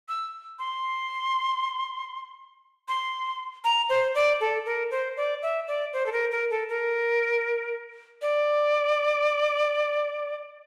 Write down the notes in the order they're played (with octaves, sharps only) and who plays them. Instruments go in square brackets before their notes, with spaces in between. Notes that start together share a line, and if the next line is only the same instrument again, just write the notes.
[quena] E6
C6
C6
A#5
C5
D5
A4
A#4
C5
D5
E5
D5
C5
A4
A#4
A#4
A4
A#4
D5